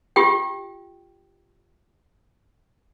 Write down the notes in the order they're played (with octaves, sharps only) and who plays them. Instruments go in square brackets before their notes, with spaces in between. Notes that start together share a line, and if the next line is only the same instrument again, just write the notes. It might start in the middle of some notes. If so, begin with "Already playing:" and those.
[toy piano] F4 G4 G5